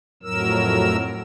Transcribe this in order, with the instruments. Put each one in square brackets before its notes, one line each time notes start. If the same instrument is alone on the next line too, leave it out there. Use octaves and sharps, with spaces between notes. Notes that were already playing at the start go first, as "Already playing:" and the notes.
[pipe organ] F2 A2 F#3 A#4 E6